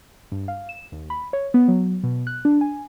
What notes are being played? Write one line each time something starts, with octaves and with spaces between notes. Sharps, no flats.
G2
F5
E7
D#2
B5
C#5
B3
F#3
B2
F#6
D4
G#5